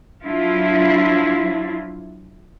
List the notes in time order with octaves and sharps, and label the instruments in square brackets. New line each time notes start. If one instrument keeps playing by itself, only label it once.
[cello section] F3 F#3 D4 E4 F4